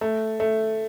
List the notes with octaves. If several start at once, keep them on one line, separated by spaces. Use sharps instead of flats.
A3
A3